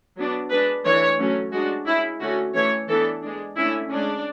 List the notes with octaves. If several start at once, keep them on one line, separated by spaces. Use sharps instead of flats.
F#3 B3 D4
G#3 D4 B4
E3 A3 D4 C#5
F#3 A3 C#4
G#3 D4 F#4
G#3 C#4 E4
D3 A3 C#4 F#4
E3 A3 C#4 C#5
E3 B3 D4 A4
G#3 D4
D3 A3 C#4 E4
G#3 C#4 D4